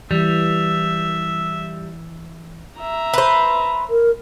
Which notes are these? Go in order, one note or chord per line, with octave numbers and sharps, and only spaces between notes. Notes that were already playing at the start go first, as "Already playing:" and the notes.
E3 G3 E5
E5 A#5
B4 C5
A#4